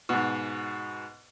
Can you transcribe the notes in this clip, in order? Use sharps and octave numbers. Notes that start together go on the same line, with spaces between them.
G#2 B2